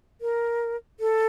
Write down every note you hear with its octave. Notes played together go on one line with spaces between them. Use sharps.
A#4
A4